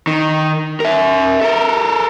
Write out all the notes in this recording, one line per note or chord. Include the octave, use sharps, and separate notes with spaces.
D#3
A#4 E5
A4 A#4